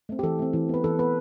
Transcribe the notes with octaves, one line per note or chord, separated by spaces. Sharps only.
A3 C4
G4
E3 A4
A3 C4
E3
B3 B4
E3 A4
B3 B4